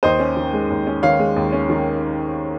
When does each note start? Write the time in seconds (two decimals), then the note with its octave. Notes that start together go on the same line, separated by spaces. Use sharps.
0.03 D#2 C5 D#5
0.19 C#4
0.37 D#3
0.53 G#3
0.70 D#2
0.87 C#4
1.03 D#3 C#5 F5
1.19 G#3
1.36 D#2
1.53 C#4
1.70 D#3